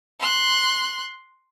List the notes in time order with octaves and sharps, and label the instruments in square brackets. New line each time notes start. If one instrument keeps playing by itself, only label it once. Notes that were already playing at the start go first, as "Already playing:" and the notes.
[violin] C6 F#6